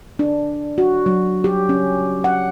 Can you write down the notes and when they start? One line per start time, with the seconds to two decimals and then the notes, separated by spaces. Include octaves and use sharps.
0.19 D4
0.78 F#4
1.06 F#3
1.44 G4
1.69 C#4
2.24 F#5